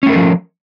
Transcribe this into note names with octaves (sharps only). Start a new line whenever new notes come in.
F3 A3 C#4 A4 A#4